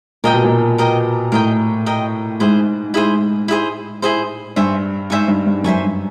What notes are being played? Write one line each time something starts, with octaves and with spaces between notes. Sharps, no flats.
A#2 A#4 D#5 G5
B2
A#2
A#4 D#5 G5
A2 A#4 D#5 G5
A#4 D#5 G5
G#2 E4 G#4 C5
E4 G#4 C5
E4 G#4 C5
E4 G#4 C5
G2 C5 E5 G#5 C#6
G#2 C5 E5 G#5 C#6
G2
G2
F#2 C5 E5 G#5 C#6
G2